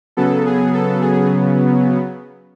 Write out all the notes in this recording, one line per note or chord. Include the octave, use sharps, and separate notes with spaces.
C#3 F#3 B3 A4
G#4
A4
G#4